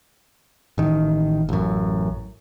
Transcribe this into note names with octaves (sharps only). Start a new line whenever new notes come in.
A1 D#3
A1 F#2